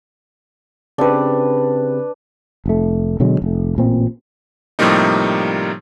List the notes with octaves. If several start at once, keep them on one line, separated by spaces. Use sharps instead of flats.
C#3 C4 D4 G4 B4
F1 A3
B2 D3 F#3 G#3
F1 A3
A1 A#2 C4
A2 C3 F3 G3 A#3 D#4